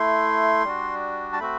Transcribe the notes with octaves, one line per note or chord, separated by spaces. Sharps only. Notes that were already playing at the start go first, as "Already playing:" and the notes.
Already playing: A3 E4 C6
G3 D4 F#4
A5
A3 C4 F#4 B5